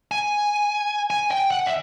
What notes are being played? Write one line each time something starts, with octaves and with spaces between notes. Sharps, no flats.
G#5
G#5
G5
F#5
E5